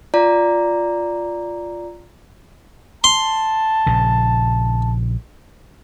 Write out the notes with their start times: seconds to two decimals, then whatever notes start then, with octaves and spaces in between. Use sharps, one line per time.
0.14 F4 D5 A#5
3.04 A5 C6
3.86 A#1 C#3